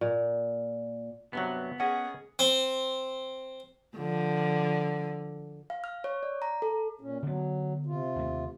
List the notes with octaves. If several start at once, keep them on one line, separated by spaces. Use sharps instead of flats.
A#2
G2 C3 F#3 B3
C#4 G#4 D#5 F#5
C4
D3 F3
F5
F6
C#5
D5
A#5
A4
A#2 C#4
D3 F#3 B3
C3 F4
D#2 A3